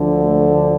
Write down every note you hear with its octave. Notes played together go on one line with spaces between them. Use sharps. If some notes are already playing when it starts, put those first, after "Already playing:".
Already playing: D2 D3 F3
A3